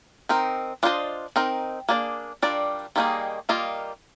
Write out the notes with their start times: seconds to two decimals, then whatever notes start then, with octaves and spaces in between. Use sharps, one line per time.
0.29 C4 D#4 A#4
0.83 D4 F4 C5 D#5
1.36 C4 D#4 A#4
1.89 A#3 D4 G#4 D5
2.42 G3 D4 F4 A#4 D5
2.96 D#3 G3 A#3 D#4 G#4
3.49 G3 A#3 F4 A#4 D#5